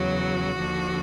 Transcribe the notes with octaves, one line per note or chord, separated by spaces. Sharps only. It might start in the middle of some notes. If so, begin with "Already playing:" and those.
Already playing: E2 C#3 F#3 F#4
D#2 D3 F3